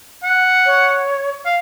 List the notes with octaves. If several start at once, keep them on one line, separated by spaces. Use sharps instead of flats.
F#5
C#5
F5